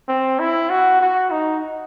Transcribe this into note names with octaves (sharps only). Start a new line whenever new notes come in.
C4
E4
F#4
F#4
D#4